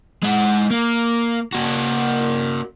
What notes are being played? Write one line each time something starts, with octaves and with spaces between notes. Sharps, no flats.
G#3 F#5
A#3
A#3 F#4